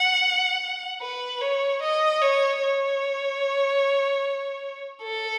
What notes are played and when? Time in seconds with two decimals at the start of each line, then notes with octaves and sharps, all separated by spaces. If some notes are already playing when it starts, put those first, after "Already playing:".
Already playing: F#5
1.01 B4
1.41 C#5
1.82 D#5
2.21 C#5
2.62 C#5
5.03 A4